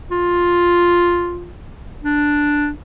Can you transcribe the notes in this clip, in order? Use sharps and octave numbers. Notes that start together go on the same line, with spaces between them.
F4
D4